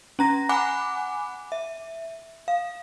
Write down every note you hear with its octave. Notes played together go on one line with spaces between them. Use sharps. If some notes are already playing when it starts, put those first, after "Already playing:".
C#4 A#5 A#6
F#5 G#5 B5 D6 F#6
E5
F5